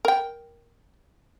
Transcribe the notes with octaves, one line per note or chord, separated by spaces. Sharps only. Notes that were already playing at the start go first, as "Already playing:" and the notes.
A#4 G5